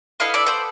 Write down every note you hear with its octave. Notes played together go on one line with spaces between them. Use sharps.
B3 E4 A4 D#5 F5
D5 E5
C5 D5